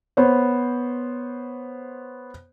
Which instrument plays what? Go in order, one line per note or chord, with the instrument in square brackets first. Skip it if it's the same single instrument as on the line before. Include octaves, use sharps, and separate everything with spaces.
[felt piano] B3 C5 C#5